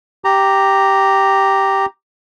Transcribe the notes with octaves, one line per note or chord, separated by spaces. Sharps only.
G4 A#5